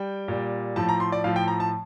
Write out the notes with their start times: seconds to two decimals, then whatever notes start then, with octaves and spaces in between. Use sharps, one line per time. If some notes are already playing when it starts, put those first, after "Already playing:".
Already playing: G3 G5
0.28 A#2 G3
0.76 A2 F3 A5
0.89 A#5
1.00 C6
1.12 D5
1.24 A2 F3 F5
1.36 G5
1.48 A#5
1.60 A5